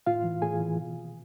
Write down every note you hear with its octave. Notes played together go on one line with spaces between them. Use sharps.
A2 F4 F5
E3
A2 G#4 G#5
E3
B2